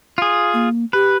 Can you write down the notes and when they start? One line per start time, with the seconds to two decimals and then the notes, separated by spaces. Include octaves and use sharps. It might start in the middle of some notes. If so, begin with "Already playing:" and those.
0.18 F4 G#4
0.54 A#3
0.93 G4 B4